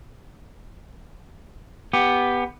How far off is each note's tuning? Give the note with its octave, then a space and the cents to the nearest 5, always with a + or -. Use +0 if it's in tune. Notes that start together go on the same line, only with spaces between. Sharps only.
B3 +0 G4 +10